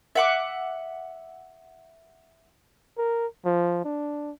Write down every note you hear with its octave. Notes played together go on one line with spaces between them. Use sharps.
E5 F#5 D6
A#4
F3
D4